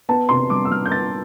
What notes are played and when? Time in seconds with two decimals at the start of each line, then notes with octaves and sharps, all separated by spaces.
0.09 B3 A5
0.29 C3 C6
0.50 G3 D6
0.65 E6
0.71 G3 F6
0.86 G6
0.92 B3 A6